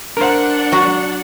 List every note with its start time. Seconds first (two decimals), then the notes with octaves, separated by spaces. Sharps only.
0.17 D4 A#4 C5 F#5
0.72 F#3 F#4